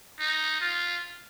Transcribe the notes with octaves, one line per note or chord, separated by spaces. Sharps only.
D#4
F4